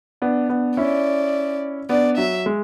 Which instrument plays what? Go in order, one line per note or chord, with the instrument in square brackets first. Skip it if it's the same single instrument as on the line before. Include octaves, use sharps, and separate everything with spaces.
[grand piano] B3 D4
B3 D4
[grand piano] C#4 E4 [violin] D5
[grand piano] B3 D4 [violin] D5
[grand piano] F#3 [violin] E5
[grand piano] G#3